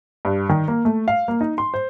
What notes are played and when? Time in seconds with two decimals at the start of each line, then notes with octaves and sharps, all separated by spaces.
0.25 G2
0.49 D#3
0.68 A#3
0.85 A3
1.08 F5
1.28 A#3
1.41 D#4
1.58 C6
1.74 C5